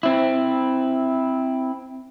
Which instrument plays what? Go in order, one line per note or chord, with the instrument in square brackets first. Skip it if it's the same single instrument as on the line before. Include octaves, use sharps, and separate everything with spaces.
[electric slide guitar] C4 E4